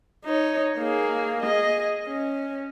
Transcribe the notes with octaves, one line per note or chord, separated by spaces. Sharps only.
D#4 C#5
A#3 G#4
G#4 D#5
C#4